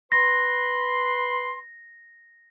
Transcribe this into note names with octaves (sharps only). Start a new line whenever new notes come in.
B4 B5 C6 A#6